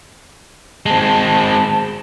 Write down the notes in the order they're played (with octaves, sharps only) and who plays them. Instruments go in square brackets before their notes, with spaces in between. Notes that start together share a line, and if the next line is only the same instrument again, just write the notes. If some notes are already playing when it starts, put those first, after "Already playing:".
[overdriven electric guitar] G#3 C4 [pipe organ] A5